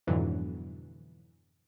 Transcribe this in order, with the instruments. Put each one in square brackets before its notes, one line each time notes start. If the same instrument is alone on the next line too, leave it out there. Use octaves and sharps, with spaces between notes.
[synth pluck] F2 G#2 B2 D3 E3 F#3